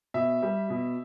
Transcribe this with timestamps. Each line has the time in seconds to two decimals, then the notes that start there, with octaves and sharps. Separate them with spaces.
0.14 B2 E5
0.42 G3
0.70 B2